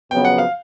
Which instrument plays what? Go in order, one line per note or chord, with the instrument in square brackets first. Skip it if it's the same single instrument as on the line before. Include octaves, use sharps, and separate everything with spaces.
[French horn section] F2 C#3 F#3 B3 [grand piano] G5
[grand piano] F#5
F5